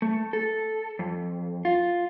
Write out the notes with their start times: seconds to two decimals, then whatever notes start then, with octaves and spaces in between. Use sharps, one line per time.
0.02 A3
0.33 A4
0.99 F2
1.65 F4